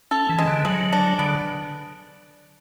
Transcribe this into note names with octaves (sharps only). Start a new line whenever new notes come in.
C#4 A4
E3
G#3
D3
F#3 G#3
D4
D3 B3